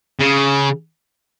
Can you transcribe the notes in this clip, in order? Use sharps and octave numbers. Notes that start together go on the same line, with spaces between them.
C#3